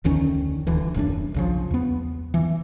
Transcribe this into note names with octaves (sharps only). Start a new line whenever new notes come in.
F1 D2 D#3 C#4
D#1 D2 D3 E3
D#1 F#2 F#3 D4
B1 C#3 F3
E2 B3
E3